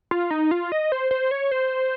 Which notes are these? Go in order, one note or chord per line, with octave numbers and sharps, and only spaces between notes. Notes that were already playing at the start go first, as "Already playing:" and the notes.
F4
D#4
F4
D#5
C5
C5
C#5
C5